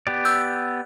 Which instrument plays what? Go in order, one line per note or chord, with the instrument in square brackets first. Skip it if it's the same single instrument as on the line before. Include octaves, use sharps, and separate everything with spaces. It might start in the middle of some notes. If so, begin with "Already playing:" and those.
[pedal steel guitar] B3 G4 D5
[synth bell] E6 G6